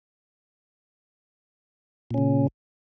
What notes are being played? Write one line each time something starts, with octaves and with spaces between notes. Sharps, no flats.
A#2 C#3 C#4